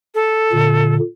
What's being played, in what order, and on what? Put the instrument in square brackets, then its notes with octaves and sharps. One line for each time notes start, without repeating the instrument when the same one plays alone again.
[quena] A4
[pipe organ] A#2 D3